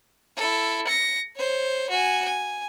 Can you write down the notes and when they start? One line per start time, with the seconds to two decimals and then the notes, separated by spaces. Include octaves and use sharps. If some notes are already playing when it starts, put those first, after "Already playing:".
0.37 E4 A4
0.87 A#6 C#7
1.37 C5 C#5
1.90 F#4 G#5
2.25 G#5